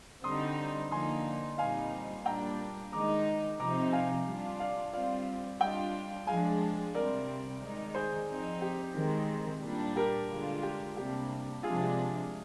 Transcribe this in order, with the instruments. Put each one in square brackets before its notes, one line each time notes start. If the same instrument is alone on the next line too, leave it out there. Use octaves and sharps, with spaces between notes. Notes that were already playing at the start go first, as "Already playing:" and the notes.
[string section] D3 G3 C4 D#4 [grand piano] C6 D#6
[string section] D3 F3 A#3 D#4 [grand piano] G#5 C6
[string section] A#2 G3 C4 D#4 [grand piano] F5 G#5
[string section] A#2 G3 A#3 D4 [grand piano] G5 A#5
[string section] D#3 G#3 D#4 [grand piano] A#5 D6
[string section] C3 F3 C4 D#4 [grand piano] A#5 D6
[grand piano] F5 G#5
[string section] G3 D4 F4
[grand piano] D5 F5
[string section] G3 C4 F4 [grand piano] D5 F5
[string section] G3 D4 F4 [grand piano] D#5 G5
[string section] F3 G#3 D4 [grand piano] F5 G#5
[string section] C3 G3 C4 [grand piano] A#4 D5
[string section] D#3 G#3 D#4
[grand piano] G#4 C5
[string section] F3 C4 D#4
[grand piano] G4
[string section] D#3 G#3 C4
A#2 G3 D4
[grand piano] G4 A#4
[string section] D3 G#3 D4 F4
[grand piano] G4
[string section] C3 G3 A#3 D4 [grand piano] G4
[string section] C3 F3 G#3 D4 [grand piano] F4 G#4
[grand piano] G4